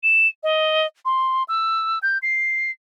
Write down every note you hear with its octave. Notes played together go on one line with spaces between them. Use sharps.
E7
D#5
C6
E6
G6
C7